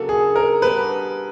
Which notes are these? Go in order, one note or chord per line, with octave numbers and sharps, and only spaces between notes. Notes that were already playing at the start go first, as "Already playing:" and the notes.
Already playing: C#3 F#3 A#3 D4 A4
G#4
A#4
G3 B3 D4 B4